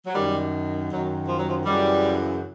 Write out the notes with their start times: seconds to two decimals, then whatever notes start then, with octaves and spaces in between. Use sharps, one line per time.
0.06 F#3
0.14 F#2 D#3 G3
0.90 F#2 D#3 F#3
1.28 F3
1.38 F#3
1.47 F3
1.65 F#2 C#3 E3 G3